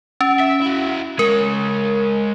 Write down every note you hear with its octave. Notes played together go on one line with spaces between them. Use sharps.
C#4
E5
E4 F#4
G#3 A#4 C#5